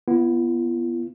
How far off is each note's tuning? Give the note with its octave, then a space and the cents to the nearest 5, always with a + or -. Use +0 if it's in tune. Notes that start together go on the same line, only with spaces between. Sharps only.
B3 -5 F4 -45